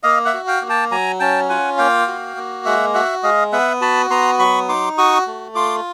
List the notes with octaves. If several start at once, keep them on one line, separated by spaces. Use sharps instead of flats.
A#3 D#5 F5
E5 F#5
F#4
F5 G5
A#3
G5 A5
F#3 G#5 A#5
C#4 G5 A5
F4 F#5 G#5
A#3 F5 G5
F#4
A#3
G#3 E5 F#5
F#4 E5 F#5
G#3 D#5 F5
B3 E5 F#5
F#4 A5 B5
B3 A#5 C6
F#3 B5 C#6
D#4 C6 D6
F#4 C#6 D#6
A3
F4 C6 D6